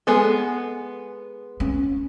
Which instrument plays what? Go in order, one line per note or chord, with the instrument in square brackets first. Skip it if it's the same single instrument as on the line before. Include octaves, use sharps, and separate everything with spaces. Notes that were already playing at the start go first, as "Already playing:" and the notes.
[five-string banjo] G#3 B3 A4
[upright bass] C#4